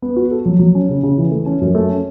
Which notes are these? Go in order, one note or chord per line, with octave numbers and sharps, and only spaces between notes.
B3
F#4
A4
F#3
F#3
C#4
C#3
C#3
E3
A3
C#4
F#2
A3
C#4